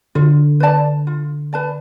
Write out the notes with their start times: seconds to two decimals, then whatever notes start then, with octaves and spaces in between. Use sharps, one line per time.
0.15 D3 F4
0.60 B4 D5 A5
1.07 F4
1.53 B4 D5 A5